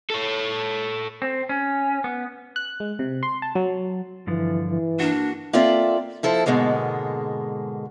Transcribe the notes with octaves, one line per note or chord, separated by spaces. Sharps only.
A4 C#5
C4
C#4
B3
F#6
G#3
C3
C6
A5
F#3
G2 D3 E3 F3
E3
A#3 D4 F#4
A#3 C4 F4 A4 D5 E5
F3 E4 A4 C5
G#2 B2 D3 G#3 A#3